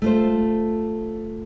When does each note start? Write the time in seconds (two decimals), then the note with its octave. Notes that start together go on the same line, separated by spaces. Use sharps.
0.02 A3 F4 C5